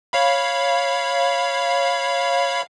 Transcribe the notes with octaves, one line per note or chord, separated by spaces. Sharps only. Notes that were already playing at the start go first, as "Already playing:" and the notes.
C#5 F5 B5